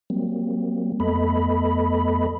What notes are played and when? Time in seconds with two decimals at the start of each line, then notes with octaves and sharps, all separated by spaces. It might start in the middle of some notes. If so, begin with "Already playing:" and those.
0.10 F#3 G3 A#3 C4
1.00 F2 A3 B3 A4 D#5 B5